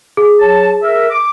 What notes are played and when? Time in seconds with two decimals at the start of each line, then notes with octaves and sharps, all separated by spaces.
0.17 G#4
0.40 F#3 C#5 A5
0.82 A#4 E5
1.10 D6